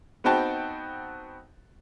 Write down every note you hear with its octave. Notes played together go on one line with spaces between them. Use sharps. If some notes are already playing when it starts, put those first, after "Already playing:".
B3 C4 D#4 F#4 G5 A5